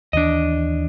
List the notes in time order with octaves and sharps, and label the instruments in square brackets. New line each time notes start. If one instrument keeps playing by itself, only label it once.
[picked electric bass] D#2 E3 [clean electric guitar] D4 D#5